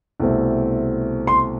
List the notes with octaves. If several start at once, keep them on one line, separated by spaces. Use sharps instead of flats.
C2 B2 A3 C4
C6